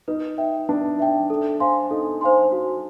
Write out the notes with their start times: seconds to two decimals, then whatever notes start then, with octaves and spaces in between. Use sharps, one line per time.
0.08 D#4 B4
0.38 E5 G5
0.69 D4 B4
0.99 E5 G5
1.30 A4
1.60 C5 F5 G#5 C6
1.91 D#4 A4
2.21 C5 F5 G#5 C6
2.52 F#4